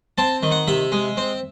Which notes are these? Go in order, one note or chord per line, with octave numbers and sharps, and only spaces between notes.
C4 A5
D#3
F#5
C3 E5
G#3
C4